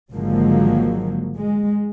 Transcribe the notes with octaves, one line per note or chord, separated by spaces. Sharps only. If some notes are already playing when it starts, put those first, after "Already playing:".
G#1 D3 F3 F#3 G#3 A#3
G#3